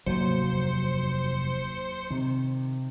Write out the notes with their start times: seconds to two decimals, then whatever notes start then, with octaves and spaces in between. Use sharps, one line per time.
0.06 F1 D#2 G#2 F#3 C5 C#7
2.11 C3 D#3